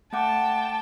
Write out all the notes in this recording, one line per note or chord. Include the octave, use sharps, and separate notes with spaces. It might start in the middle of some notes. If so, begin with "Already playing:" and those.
A3 F#5 G5 A5 D6